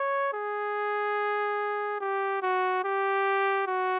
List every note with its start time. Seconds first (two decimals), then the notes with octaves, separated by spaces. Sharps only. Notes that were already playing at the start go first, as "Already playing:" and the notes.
Already playing: C#5
0.33 G#4
2.01 G4
2.42 F#4
2.84 G4
3.67 F#4